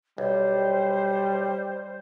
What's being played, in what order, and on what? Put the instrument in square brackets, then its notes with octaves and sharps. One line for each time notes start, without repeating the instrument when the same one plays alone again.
[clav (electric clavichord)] B1 [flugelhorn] G3 [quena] C5